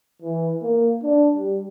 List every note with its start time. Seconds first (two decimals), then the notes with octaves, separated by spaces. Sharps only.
0.22 E3
0.62 A#3
1.03 D4
1.36 G3